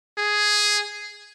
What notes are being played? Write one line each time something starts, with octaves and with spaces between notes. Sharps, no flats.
G#4